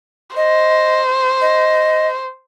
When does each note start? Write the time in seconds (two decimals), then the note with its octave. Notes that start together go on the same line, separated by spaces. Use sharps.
0.36 C5 D#5
1.41 D#5